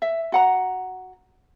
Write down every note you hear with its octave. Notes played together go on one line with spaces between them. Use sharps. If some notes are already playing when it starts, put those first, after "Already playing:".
E5
F#4 F#5 A#5